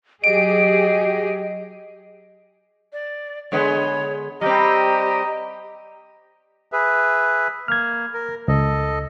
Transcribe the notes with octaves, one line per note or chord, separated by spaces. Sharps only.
F#3 G4 G#4 D#5 D7
D5
D3 G#3 B3 C#5
G3 C4 G4 D#5 A#5
G#4 B4 E5
A#3 F6 G#6
A#4
C#2 A4 D#5